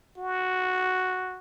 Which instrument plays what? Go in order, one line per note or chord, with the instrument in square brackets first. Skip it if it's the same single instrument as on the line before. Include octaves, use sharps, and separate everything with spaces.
[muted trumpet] F#4